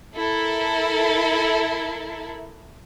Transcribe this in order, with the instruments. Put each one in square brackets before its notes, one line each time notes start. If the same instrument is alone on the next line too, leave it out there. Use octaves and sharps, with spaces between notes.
[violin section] E4 A4 A#4